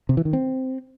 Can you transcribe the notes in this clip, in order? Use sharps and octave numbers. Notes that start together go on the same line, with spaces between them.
C3
E3
D#3
C4